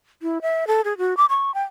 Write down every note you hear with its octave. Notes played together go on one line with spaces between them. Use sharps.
E4
E5
A4
G#4
F#4
D6
C#6
G5